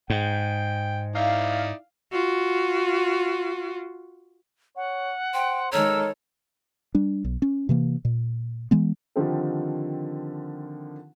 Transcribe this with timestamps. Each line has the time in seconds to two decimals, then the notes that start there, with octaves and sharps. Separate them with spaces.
0.10 G#2 G5
1.15 D#4 E4 D5 F5
2.12 F4 F#4
4.76 C#5 F#5
5.34 C5 G5
5.72 D#3 G#3 A4 A#4 C#5 E6
6.95 G3 D4
7.24 B1
7.42 C#4
7.69 C3 E3 A#3
8.05 A#2
8.71 E3 G#3 B3
9.16 D3 D#3 F3 C4 G4 A4